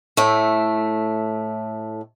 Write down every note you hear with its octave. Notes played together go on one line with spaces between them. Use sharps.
A2 A3